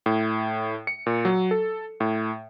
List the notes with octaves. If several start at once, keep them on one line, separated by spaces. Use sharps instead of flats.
A2
C#7
A#2
F#3
A4
A2